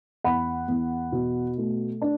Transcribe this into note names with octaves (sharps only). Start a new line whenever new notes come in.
E2 F#5 B5
E2
B2
A3
D4